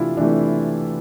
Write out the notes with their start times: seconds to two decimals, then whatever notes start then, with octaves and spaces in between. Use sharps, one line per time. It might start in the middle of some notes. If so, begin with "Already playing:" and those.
Already playing: C3 E3 A3 D4 E4 F4
0.17 C3 E3 A3 D4